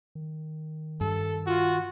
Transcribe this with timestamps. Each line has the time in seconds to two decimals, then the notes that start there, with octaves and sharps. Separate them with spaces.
0.15 D#3
1.01 G2 A4
1.47 F4 F#4